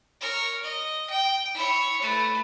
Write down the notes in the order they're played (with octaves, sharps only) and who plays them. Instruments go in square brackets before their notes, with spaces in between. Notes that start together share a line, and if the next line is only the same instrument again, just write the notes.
[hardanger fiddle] A#4 C#5
D#5
G5
E4 C#5
A3 B4